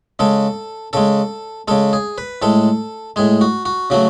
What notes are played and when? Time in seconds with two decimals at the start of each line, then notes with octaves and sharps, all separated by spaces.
0.19 C#3 G#3 A4
0.93 C#3 G#3 A4
1.68 C#3 G#3 A4
1.93 G#4
2.18 B4
2.42 A2 G#3 A4
3.16 A2 G#3 G#4
3.41 F#4
3.65 F#4
3.90 C#3 F#3 A3 F#4